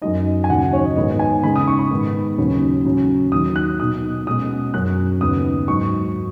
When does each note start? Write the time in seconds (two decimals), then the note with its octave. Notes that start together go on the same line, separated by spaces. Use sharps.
0.02 F#2 F#3 D#4 D#5
0.44 G#5
0.49 D#2 C#3 F#3 D#4 F#5
0.73 C#5
0.85 D#5
0.96 G#2 D#3 G#3 B3 D#5
1.19 G#5
1.43 C#3 G#3 D#4 B5
1.56 D#6
1.68 C#6
1.79 B5
1.91 G#2 D#3 G#3 B3
2.38 D#2 C#3 F#3 C#4
2.85 C#3 F#3 C#4
3.32 D#2 D#3 F#3 D#6
3.56 F#6
3.80 B2 F#3 D#4 D#6
4.27 B2 G#3 C#4 D#6
4.74 F#2 F#3 C#4 F#6
5.21 D#2 C#3 B3 D#4 D#6
5.68 G#2 F#3 D#4 C#6